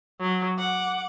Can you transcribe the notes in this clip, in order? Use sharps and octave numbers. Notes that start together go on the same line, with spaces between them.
F#3
F#5 D6